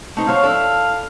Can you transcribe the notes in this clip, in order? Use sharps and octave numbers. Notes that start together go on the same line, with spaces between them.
A3 D#4 C5
F#3 C5 C#5 F5
D4 E4 A4